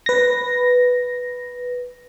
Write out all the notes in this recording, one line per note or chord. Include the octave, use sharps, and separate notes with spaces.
B4 A#6